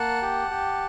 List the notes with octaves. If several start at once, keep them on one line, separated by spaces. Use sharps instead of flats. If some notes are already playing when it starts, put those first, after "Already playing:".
Already playing: A#3 F#5 A5
G4
G4